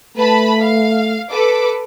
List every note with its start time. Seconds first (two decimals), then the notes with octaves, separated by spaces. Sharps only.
0.17 A3 B4 A5 B5
0.60 F5
1.30 A4 B4 D6